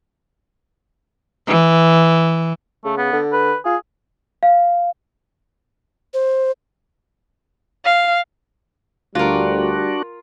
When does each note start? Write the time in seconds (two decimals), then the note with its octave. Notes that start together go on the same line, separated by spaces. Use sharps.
1.47 E3
2.85 C#3 A3
2.98 B3
3.13 D3
3.33 B4
3.65 F4 G#4
4.43 F5
6.14 C5
7.85 F5
9.15 D2 G3 D4 F4 F#4 A#4